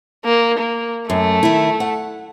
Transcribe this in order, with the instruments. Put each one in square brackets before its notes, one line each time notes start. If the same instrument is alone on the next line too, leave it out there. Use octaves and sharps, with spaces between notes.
[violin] A#3
A#3
[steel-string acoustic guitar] F#2 [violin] A3
[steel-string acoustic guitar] D#3 E4
F#5